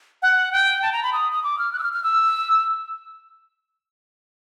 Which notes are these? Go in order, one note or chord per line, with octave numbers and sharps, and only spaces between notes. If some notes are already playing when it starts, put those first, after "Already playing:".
F#5
G5
A5
A#5
B5
D#6
D#6
D6
F6
F#6
E6
F6
F6
E6